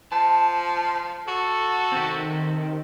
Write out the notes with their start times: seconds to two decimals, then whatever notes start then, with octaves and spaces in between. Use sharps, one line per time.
0.12 F3 A5
1.28 F#4 A4
1.92 D#3 C4 G4